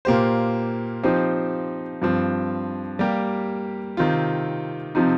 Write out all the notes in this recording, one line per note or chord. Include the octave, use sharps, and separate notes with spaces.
A#2 A#3 G4 C5
F3 C4 D#4 G4 C5
G2 F3 C4
G3 A#3 G4
C3 D#3 C4 F4
C3 F3 C4 D#4